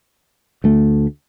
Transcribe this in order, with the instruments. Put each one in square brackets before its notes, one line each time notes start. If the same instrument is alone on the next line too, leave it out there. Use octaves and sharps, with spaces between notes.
[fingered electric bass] D2 A3